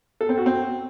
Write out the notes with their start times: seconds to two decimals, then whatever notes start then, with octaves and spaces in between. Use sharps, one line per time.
0.21 A4
0.29 C4
0.38 F#4
0.46 C4